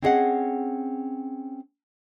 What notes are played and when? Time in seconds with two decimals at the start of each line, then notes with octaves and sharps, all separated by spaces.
0.02 C4 C#4 E4 G#4 D#5 F#5